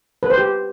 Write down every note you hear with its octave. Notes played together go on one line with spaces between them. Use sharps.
B4
C5
G4